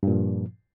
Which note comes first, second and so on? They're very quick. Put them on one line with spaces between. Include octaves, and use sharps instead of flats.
G2 A#2 F3